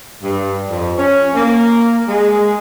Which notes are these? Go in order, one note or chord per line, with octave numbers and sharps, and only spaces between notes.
G2
F2
C#4
A#3
G#3